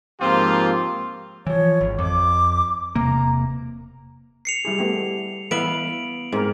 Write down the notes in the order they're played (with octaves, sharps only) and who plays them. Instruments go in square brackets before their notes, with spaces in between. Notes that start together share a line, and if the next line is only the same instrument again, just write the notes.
[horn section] G#2 F3 A#3 C4 F4 G4
[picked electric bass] E3 F3 [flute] C#5
[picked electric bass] G#1
[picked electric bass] F2 [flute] D6
[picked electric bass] E1 C3 A#3 [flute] A#5
[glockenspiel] C7 C#7 F7
[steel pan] G3 E4 G#4
A3 B3 G4
[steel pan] E3 [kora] B3 E5 F5 [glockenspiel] D7 F#7
[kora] G#2 [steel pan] C4 A#4